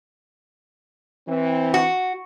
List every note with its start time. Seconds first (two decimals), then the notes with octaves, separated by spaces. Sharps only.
1.28 E3 C4
1.74 F#4